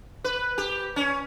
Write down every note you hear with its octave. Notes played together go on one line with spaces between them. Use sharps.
B4
G4
C#4